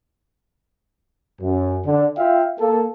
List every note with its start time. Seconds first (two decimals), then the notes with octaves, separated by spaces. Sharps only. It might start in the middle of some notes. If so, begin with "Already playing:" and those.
1.41 F#2
1.85 D3
2.18 F4 E5 F5 G5
2.60 A#3 A4